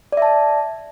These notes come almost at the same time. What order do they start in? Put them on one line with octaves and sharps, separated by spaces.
D5 E5 A5